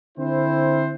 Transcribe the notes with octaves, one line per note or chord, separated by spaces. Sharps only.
D3 C4 E4 C5